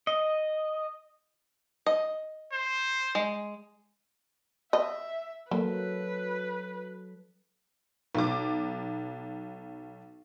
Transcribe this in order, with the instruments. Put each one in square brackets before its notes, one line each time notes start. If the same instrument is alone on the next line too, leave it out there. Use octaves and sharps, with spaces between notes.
[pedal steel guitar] D#5
[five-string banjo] D#5
[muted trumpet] C5
[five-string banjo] G#3
[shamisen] D#5 [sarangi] E5
[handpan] F#3 A4 [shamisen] A#3 [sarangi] B4
[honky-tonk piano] B1 D6